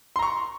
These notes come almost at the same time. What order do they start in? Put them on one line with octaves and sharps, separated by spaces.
C6 A#5 C#6